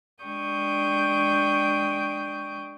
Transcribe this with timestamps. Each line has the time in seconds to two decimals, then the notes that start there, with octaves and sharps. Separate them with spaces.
0.24 G#3 D4 G5 C#6 D#6 G6